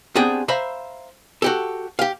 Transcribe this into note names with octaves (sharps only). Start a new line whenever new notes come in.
B3 C4 D4 G4 G#4
C5 E5 F5 A#5 B5
F#4 G4 A4
G4 F5